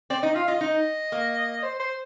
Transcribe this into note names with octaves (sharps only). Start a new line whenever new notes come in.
C4 D5
D#4 D#5
F4 F5
F4 D#5
D#4
A#3
C5
C5